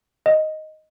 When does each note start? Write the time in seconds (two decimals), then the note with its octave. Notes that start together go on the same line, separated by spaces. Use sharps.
0.26 D#5